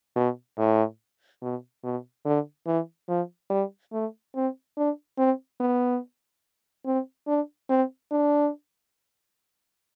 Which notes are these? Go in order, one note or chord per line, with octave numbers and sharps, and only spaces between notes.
B2
A2
B2
B2
D3
E3
F3
G3
A3
C4
D4
C4
B3
C4
D4
C4
D4